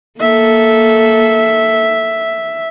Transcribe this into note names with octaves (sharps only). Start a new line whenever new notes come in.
A#3 A4 E5